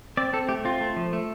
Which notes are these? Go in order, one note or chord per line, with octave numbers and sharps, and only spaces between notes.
C4 D5
C4 A4
A3 G4
C4 F4
A3
F3
A3